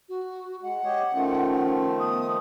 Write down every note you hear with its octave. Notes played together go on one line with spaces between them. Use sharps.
F#4
G#3 F#5
G4 C#5 D#5
D#3 F3 A3 C#4
B3 D#6